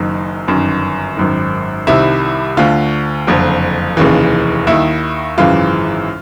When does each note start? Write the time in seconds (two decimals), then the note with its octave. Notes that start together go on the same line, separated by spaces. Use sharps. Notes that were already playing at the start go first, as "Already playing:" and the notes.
Already playing: F#1 F#2 D#3 D#4
0.48 G1 F#2 D#3
1.17 G#1 F#2 D#3
1.87 C2 C3 D#3 E4
2.57 D2 D3 F4
3.27 F#1 F2 D3
3.97 F1 D#2 C#3 E3
4.67 D#2 D#3 E4
5.38 G#1 F#2 C#3 E3 F4